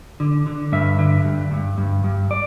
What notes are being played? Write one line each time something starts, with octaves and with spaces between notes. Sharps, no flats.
D3
D3
G2 E5
D3
G2
G2
G2
G2
D5